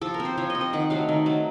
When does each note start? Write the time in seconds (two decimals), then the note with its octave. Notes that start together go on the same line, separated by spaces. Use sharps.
0.01 F3 A4
0.14 A#4
0.20 C4
0.25 C5
0.37 F3 C#5
0.50 D#5
0.55 C4
0.61 D#5
0.73 D#3 F#5
0.90 F#3 A3 F5
1.09 D#3
1.26 F#3 A3